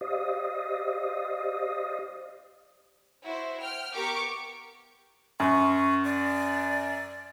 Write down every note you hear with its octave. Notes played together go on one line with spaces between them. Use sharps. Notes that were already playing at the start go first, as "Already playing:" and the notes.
G4 C5 D5 D#5 F5 D#6
E4 F#4 C5
G5 F6
B3 G4 A#4 C#6 D6 C#7
F#2 C#6
D5